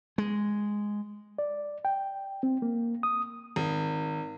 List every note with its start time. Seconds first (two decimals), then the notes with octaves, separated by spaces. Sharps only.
0.18 G#3
1.38 D5
1.85 G5
2.43 C4
2.62 A#3
3.03 D#6
3.56 G#1